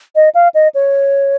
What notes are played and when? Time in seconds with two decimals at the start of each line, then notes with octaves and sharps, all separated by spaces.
0.16 D#5
0.35 F5
0.54 D#5
0.75 C#5